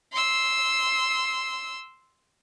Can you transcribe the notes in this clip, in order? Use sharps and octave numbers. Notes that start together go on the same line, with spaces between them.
C6 E6